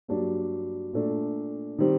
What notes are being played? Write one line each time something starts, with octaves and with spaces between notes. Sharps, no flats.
G2 F#3 A#3 D4
A#2 A3 D4
D#3 G3 C4